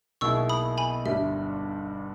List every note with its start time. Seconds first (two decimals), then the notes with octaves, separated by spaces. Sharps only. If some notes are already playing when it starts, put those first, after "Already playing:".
0.21 B1 B2 A#3 E4 G#4 C#6 E6
0.49 B5 D#6
0.78 G#5 B5
1.05 G1 G2 G3 E5